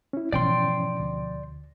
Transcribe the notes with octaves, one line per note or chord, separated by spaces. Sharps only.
C#4 E4
G#2 B2 E3 F3 C#4 D5 G5 C6
D2